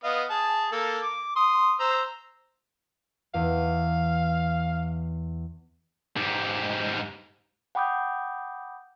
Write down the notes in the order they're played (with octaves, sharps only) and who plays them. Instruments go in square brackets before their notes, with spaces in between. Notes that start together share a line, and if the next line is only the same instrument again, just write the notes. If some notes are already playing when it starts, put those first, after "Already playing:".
[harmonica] B3 D#5 F5
G#4 A5
A#3 A4
D6
C6 D#6
C5 A#5 E6
[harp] E2 [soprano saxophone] F5
[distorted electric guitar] G#2 G3
[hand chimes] F#5 G5 B5 D6 D#6 G6